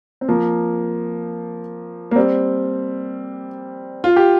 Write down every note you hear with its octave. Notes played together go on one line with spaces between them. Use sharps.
C4
F3 A#3
A#3
G3 C4
F4
G4